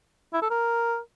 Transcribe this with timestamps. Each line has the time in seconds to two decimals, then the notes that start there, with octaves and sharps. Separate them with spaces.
0.33 E4
0.42 A4
0.50 A#4